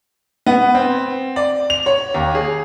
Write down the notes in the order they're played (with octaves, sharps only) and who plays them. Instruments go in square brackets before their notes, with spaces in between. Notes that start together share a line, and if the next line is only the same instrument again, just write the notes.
[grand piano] B3
C4
D5
F7
C#5
D#2
G#4